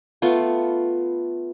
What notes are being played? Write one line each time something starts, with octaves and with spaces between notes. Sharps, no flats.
A3 B3 F4